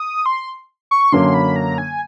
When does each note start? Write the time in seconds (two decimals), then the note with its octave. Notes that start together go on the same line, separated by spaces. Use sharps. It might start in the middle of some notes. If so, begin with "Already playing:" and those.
Already playing: D#6
0.26 C6
0.91 C#6
1.12 F#2 D3 F#3 A#3 C#4 C6
1.34 B5
1.56 A#5
1.78 G#5